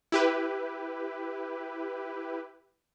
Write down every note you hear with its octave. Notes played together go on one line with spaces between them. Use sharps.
E4 G4 B4